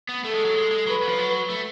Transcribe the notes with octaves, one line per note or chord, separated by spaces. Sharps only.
B3
A3 A4
G#3
F#3
G#3
G#3
F#3 B4
F#3
F3
F#3
A3